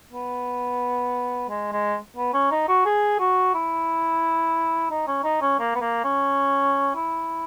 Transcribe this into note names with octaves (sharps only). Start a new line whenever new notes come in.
B3
G#3
G#3
B3
C#4
D#4
F#4
G#4
F#4
E4
D#4
C#4
D#4
C#4
A#3
B3
A#3
C#4
E4